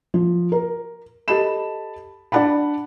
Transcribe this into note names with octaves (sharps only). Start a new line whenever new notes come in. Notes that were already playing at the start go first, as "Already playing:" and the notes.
F3
A#4
G4 A4 D#5 A5 B5 E7
D4 D5 F#5 A5 B5